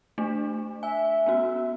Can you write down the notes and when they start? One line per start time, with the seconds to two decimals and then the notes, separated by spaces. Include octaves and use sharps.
0.18 A3 D4
0.83 E5 G#5
1.26 B3 C#4 F#4